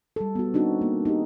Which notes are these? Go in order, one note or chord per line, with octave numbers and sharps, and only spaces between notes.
G3 A4
B3 F#4
C4 D4 D#4 F#4
A#3
D#4 G4